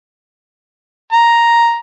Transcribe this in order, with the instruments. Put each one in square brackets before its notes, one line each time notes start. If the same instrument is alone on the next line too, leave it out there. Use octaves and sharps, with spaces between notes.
[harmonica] A#5